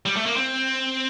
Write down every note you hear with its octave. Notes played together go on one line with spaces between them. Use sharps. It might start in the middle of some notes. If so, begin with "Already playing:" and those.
G3
A3
A#3
C4